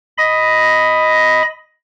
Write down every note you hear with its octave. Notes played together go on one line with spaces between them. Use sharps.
D#5 B5 A#6